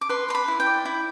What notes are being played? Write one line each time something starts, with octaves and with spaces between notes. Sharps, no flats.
D6
B4 C6
B4 C6
B5
E4
G5
D5
E4